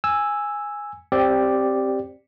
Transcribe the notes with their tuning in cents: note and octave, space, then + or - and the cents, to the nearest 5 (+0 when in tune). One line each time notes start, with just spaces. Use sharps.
G#5 -5 E6 +0
C4 +15 G4 +0 D5 +0